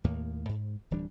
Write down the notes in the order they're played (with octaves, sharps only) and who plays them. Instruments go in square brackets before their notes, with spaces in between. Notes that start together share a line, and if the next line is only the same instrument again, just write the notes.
[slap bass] D#2 A2 A#3
G#2
D1 E3 G3 D4